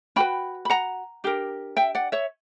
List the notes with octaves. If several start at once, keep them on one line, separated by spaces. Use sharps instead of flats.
C#4 F#4 B4 G5 B5
B5
F#5 A#5
D4 G4 A#4
E5 G5
D5 F#5
C#5 E5